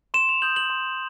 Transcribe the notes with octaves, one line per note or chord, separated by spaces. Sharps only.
C6 E7
F7
D#6 G6 F#7
F#7
C6